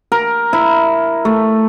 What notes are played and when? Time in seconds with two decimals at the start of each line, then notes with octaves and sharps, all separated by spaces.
0.12 A#4
0.53 E4
1.25 A3